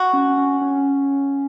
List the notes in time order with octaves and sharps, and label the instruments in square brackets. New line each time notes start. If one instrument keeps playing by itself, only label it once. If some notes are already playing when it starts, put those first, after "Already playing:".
Already playing: [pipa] F#4
[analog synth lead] C#4
C#4
C#4